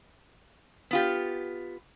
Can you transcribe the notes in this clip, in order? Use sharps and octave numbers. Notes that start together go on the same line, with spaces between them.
B3 F4 G4